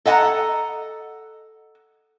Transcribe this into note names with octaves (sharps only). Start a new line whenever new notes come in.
A4 D#5 F#5 G#5 A#5